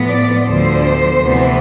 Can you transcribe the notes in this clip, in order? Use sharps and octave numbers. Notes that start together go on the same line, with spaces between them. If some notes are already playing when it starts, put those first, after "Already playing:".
Already playing: A2 F3 B3
D5
D2 D3 F3 B3 C5
D2 C3 E3 B3